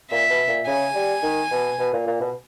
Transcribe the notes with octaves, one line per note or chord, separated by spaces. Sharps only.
A#2 E5
B2
A#2
C#3 G#5
G3
D#3
B2
B2
A#2
A#2
B2